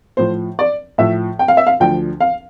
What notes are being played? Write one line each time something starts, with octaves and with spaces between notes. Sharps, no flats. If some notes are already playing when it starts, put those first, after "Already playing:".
A2 F3 C5
D5
A2 F3 E5
G5
F5
E5
F5
D2 D3 F3 G5
F5